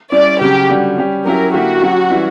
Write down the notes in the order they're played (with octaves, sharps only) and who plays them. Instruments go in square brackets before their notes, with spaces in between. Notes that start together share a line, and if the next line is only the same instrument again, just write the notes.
[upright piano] G3 C#4 E4 [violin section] D5
[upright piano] C#3 F#3 C#4 [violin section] G4
[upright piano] D3 G3 C#4 F#4
G3 C#4 G4
[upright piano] F#3 C#4 E4 G4 [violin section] A#4
[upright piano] D3 A#3 E4 G4 [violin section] F#4
[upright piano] F#3 C#4 G4
E3 G3 C#4 E4